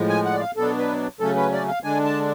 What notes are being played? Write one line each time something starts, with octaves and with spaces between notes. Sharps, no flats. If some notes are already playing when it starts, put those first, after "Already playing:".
Already playing: A2 F3 G#3
G#5
F#5
D5
F5
B2 F#3 B3 D4 A4
B4
C#3 F#3 A3 C#4 A4
B4
D5
F5
D3 G#3 D4 G#5
A5